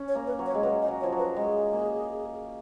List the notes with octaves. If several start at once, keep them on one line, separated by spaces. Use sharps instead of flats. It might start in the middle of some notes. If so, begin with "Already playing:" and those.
Already playing: C#4
C#5
A#3
B4
F#3
C#5
G#3
F#3 B4
D#5
F#3
C#5
F3
F#3
B4
G#3 G#4
A#3